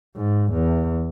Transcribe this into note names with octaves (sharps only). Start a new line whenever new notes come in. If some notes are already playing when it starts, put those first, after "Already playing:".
G#2
E2